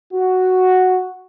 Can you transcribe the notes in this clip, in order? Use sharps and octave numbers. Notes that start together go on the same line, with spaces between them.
F#4